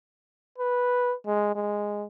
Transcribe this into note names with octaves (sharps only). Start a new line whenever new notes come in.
B4
G#3
G#3